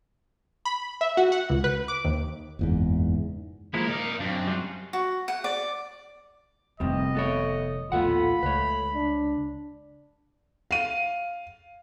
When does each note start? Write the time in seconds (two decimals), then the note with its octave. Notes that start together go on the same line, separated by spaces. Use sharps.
0.65 B5
1.01 E5
1.17 F#4
1.32 F#5
1.50 C#2
1.64 B4
1.88 D6
2.04 D#2
2.59 F#1 E2 G#2
3.74 F3 G#3 A#3 E4
3.88 D#4 A#4 D5 F5
4.20 F#2 C4 D4
4.48 G3 F4 F#4
4.93 F#4
5.28 F#5
5.44 D5
6.80 F1 F2 A2 C3 D#3 G3 D#5
7.15 B3 A4 C#5
7.92 A#1 D#2 A2 B3 F4 A4 F#5 B5
8.43 C#2 A3 B4 C#5
8.95 D4
10.71 F5 D#7